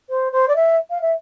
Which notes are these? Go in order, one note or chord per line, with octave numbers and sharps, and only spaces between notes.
C5
C5
D5
E5
F5
E5